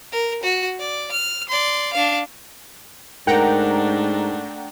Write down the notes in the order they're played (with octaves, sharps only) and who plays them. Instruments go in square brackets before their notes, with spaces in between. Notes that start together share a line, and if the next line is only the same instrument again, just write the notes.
[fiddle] A#4
F#4
D5
F6
D5 C6
D4 F5
[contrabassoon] G#2 [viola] A3 D4 [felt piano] A#4 [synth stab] F#5 G5 A#5